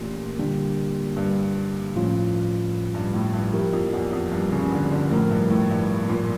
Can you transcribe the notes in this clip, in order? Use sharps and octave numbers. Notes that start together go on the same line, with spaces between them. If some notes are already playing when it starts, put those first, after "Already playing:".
Already playing: A#2 E3 A3 C#4 G4 A#4
D3 G3 A#3 D4 G4
G2
A2 F3 C#4 F4
G2
A2
G2
F3 A#3 E4 G4 A#4
F2
E2
F2
G2
C#3
D3
D3
A2 C#3 F3 A3 E4 A#4
G2
A2
G2
A2
A#2